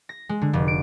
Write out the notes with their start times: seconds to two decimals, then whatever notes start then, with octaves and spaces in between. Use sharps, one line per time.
0.09 A#6
0.29 G#3
0.42 D3
0.53 F1
0.68 D7